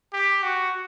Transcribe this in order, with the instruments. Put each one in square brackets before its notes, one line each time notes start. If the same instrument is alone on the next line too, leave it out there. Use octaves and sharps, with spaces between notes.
[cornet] G4
F#4